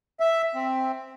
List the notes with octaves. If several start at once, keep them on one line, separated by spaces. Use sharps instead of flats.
E5
C4